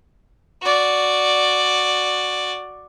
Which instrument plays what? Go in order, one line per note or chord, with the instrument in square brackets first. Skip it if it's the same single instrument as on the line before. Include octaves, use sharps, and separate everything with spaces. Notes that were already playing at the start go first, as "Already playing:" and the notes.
[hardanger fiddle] F#4 D5